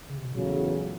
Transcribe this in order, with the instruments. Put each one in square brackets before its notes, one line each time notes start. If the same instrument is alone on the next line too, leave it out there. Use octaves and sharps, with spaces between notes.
[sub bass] C#3
C3
B2
[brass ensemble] E2 C#3 F#3 A3 [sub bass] A#2